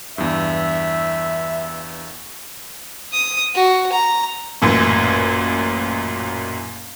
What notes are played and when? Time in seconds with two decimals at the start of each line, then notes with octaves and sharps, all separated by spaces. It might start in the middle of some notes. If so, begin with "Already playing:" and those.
0.18 E2 G2 E5
3.13 D#6
3.55 F#4
3.92 A#5
4.62 A1 F#2 A#2